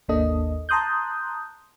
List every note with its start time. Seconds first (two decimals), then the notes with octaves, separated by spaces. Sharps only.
0.08 G#1 D#2 A#3 D4 A4 D#5
0.69 A5 A#5 C6 D#6 F#6 G6